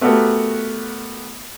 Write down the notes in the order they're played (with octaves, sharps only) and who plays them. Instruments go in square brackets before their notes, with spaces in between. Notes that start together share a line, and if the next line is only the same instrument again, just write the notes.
[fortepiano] A3 B3 F#4 G4 A#4